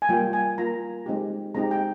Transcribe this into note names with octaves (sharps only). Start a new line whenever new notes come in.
G#5
G3 A#3 F4 G5
G#5
G3 A#3 F4 A#5
G#3 C4 D#4 G4
G#3 C4 D#4 G4 A#5
G5